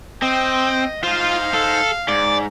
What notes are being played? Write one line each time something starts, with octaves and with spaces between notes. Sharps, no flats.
C4 D#5 G5
D#4 F4 C5 F5
A4
G#2 D5